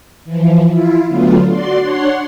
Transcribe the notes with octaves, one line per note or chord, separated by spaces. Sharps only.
E3 F3
E4 F4
D3 F#3 A3 B3 F4
F#4 D5 C6
D4 C#5 F#5 C6